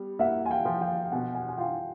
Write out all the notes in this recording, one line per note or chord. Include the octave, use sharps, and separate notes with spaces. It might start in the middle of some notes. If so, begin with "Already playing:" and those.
Already playing: G3 B3
A#3 E5 F#5
G#5
F5 G5
F3
F5 G5
B2 F#5 G#5
F#5 G#5
G#5
F4 F5 G5